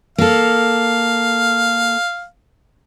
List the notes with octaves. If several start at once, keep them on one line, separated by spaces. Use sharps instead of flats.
A#3 A4 F5